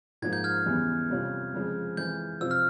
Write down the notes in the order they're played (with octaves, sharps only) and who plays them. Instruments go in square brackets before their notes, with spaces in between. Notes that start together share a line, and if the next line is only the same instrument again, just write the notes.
[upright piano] G#2 F3 A#3 [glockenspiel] G#6
[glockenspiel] G6
F6 G#6
[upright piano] E2 C#3 E3 G3
F2 C3 G3 C#4 F4
F2 C#3 F3 G#3
[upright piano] F2 E3 G#3 [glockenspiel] G6
[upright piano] C3 F3 C4 F4 [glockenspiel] E6
[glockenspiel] F6